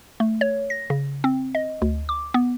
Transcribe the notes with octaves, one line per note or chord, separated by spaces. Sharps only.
A3
C#5
A#6
C#3
C4
D#5
D2
D6
B3